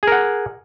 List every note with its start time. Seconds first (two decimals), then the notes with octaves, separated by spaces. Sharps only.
0.03 G#4
0.07 A#4
0.12 F#5